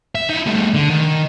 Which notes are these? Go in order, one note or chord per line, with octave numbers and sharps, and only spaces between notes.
E5
D#4 E4
G3 A3
D3
D#3